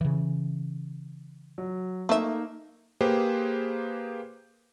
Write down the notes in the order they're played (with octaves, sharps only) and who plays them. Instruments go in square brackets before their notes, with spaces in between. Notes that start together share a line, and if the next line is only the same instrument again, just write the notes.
[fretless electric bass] C#3 E3
[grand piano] F#3
[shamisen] A3 E5 [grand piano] A#3 D#4
[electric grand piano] A#3 G4 G#4 B4 C5